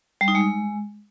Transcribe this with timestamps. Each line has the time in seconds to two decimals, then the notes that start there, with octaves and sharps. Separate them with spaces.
0.21 G3
0.28 D#4
0.35 G#3